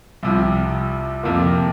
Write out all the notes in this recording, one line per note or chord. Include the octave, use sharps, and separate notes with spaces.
C2 C3 F3
F2 C3 A#3 F4